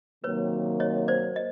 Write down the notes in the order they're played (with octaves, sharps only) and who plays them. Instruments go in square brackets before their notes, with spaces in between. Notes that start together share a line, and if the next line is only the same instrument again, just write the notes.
[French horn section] C3 D#3 F#3 A#3 [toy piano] B4 C#5
[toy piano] C#5 D#5
C5 D5
D#5